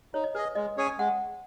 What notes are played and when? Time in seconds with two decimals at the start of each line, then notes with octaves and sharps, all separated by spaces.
0.14 D#4 C#5
0.24 D#5
0.35 G#4 B4
0.38 D#5
0.55 G#3 D#5
0.77 C#4 G#4 C#5 G#5
0.99 G#3 F#5